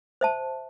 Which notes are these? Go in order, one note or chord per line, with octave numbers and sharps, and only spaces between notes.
C5 E5 A5